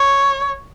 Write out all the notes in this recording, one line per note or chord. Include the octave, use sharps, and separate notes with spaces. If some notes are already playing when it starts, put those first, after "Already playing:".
Already playing: C#5